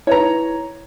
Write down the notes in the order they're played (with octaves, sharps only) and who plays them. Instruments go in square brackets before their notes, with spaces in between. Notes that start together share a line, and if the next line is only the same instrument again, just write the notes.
[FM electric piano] E4 B4 [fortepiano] C#5 A#5